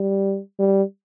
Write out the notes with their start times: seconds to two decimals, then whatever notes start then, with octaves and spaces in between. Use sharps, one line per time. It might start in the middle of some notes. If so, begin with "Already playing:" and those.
Already playing: G3
0.59 G3